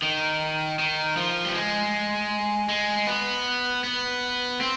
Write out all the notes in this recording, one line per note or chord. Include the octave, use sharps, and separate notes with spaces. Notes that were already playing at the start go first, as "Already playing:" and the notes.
D#3
D#3
F3
G3
G#3
G#3
B3
B3
C4